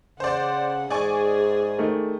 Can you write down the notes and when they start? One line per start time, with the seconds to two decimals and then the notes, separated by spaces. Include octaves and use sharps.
0.20 C#3 C5 D5 F#5
0.90 G#2 G#4 D5 G#5 C#6
1.79 D#3 A3